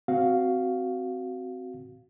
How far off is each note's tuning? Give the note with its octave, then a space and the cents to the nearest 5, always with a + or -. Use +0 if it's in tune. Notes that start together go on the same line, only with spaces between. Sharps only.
C4 -15 F#4 +10 F5 +0